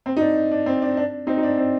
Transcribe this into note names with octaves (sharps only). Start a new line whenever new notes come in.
C4
D#4
D4
D4
C4
D4
D4
C4 D#4
D#4
D4
C4